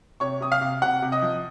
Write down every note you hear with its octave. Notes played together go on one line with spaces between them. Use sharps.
C3 C#5 C#6
C3 D#6
F5 F6
C3
C3 F#5 F#6
C3
D#5 D#6
F3